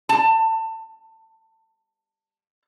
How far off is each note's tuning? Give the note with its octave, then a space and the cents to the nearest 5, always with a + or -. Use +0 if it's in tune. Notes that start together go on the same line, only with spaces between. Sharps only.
A5 +25